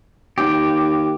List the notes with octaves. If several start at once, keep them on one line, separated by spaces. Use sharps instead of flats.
D#2 G4